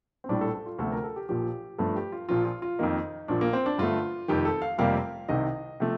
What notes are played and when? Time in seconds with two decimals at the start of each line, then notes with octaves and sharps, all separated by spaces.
0.24 C4
0.29 A#1 A2 G3 D4
0.41 A4
0.55 A4
0.66 F4
0.79 D2 C3 F3 A3 A4
0.92 A#4
1.04 A4
1.16 G4
1.29 A#1 A#2 F3 G4
1.78 G2 F3 A3 A4
1.96 G4
2.12 F4
2.29 A#1 A#2 F3 F4
2.45 F4
2.62 F4
2.79 F2 D#3 A#3 D#4
3.28 A#1 A#2 F3 D4
3.41 A#3
3.53 C4
3.66 D4
3.78 G2 D3 A3 F4
4.28 F1 F2 D#3 G4
4.45 A4
4.62 F5
4.78 F1 F2 C3 G3 A#3 F5
5.28 C2 C3 D#3 D#5
5.80 C3 F3 A3